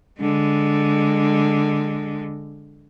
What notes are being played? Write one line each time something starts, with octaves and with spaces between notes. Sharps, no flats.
D3 G#3